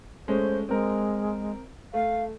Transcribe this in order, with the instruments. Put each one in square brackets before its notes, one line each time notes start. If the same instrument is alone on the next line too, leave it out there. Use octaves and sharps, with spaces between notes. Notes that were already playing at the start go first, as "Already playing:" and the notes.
[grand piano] G#3 A3 C#4 [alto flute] C5
[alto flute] G#3 [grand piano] C4 A#4
[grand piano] A3 [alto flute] F5